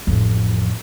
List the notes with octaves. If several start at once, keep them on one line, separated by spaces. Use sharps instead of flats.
A1 F2